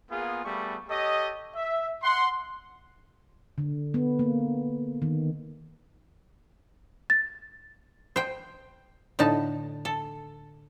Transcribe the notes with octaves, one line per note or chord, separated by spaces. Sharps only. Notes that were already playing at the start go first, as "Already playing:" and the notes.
A#3 B3 F4 G#4
G3 A3 B3 G#4 C#6
G4 A4 C#5 D#5
E5
F#5 C6
D3
B3
A#3
D#3
A6
C5 G5
A2 D3 D#4 A5
A4